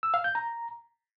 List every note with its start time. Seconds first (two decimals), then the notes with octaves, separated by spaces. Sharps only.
0.03 E6
0.14 F5
0.24 G6
0.35 A#5